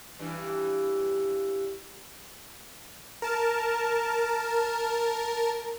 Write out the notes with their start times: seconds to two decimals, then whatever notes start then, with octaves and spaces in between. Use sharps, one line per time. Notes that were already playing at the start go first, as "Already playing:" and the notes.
0.19 G2 E3
3.22 A#4 A5